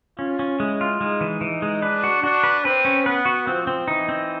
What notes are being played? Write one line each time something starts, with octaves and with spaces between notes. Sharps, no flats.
C#4 F4
C#4
G#3 E4
F4
G#3 D#4
E3
E3
G#3
D4 B4
F#4
D4 F#4
B4
C4 B4
C#4
B3 B4
F#4
F3 C4
C4
E3 D#4
C4